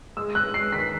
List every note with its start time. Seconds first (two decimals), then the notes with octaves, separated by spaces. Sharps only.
0.17 G#3 E6
0.35 G#3 F#6
0.54 G#3 C7
0.73 D#3 B6